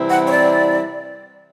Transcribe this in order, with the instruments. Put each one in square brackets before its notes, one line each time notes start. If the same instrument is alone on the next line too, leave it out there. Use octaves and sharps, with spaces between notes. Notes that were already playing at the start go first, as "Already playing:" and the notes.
Already playing: [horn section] C3 E3 G3 C4 E4
[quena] F#5
C#5
D5